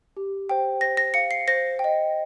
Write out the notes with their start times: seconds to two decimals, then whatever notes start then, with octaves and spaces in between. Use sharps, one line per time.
0.17 G4
0.49 C5 G5
0.81 C5 A#6
0.97 A#6
1.14 F5 C#7
1.31 C7
1.48 C5 A#6
1.79 G5
1.84 D#5